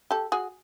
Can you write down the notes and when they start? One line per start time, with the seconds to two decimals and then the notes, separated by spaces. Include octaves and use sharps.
0.11 G4 A4
0.32 F#4 G#4